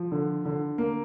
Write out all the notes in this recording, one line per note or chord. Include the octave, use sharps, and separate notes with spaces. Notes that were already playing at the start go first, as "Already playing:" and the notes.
Already playing: F3
D3
D3
A#3